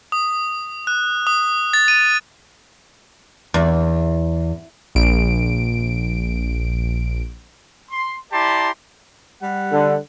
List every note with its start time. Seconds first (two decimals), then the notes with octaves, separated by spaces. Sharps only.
0.12 D#6
0.87 F#6
1.27 D#6
1.73 A6
1.88 D#7
3.54 E2
4.95 A#1 D7
7.91 C6
8.33 E4 G4 D5 A5 A#5 C6
9.42 G3 F#5
9.72 D3